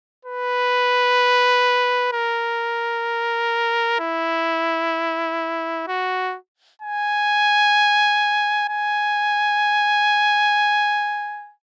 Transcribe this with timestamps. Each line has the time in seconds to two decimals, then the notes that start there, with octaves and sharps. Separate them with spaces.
0.25 B4
2.13 A#4
4.00 E4
5.87 F#4
6.82 G#5
8.69 G#5